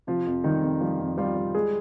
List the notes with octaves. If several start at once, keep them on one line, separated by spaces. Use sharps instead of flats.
C3 F3 F4
F2
D#3 G3 D#4
F2
F3 G3 F4
F2
F3 G3 F4
G3
G#3 G#4